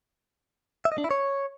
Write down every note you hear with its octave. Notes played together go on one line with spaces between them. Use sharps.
E5
D#5
D4
E4
C#5